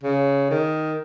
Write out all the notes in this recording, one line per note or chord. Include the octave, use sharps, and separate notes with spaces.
C#3
D#3